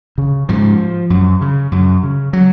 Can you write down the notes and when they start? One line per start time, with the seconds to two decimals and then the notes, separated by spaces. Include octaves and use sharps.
0.18 C#3
0.49 G#2 F3
1.10 F#2
1.41 C#3
1.72 F#2
2.03 C#3
2.33 F#3